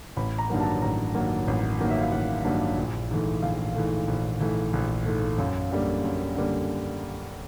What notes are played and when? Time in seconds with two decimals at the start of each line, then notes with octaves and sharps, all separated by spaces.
0.17 A1 B5
0.39 A#5
0.50 G2 D#3 F#3 A#3
0.60 A5
0.82 A1 A#5
1.15 G2 D#3 F#3 A#3
1.48 A1
1.80 G2 D#3 F#3 A#3
1.90 E5
2.01 F5
2.12 A1 F#5
2.45 G2 D#3 F#3 A#3
2.77 A#1
3.11 G#2 E3 A3
3.42 A#1 F5
3.75 G#2 E3 A3
4.08 A#1
4.40 G#2 E3 A3
4.73 A#1
5.06 G#2 E3 A3
5.38 F#2 F5
5.71 D3 G3 A#3
6.04 F#2
6.35 D3 G3 A#3